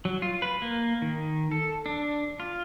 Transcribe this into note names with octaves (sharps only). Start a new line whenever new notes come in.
F#3
F4
B4
A#3
D#3
A4
D4
F4